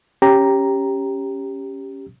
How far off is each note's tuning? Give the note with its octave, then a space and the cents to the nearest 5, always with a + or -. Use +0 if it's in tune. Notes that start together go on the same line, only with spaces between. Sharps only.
C#4 +0 G4 +0 A#5 +0